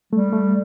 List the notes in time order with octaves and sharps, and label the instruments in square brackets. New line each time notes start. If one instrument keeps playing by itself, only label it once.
[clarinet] G3 [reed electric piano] A3
[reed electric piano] A3